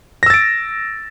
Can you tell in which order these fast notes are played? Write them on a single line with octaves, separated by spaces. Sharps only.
A#6 E6 A6 D7